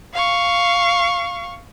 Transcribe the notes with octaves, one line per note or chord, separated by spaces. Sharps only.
F5 C#6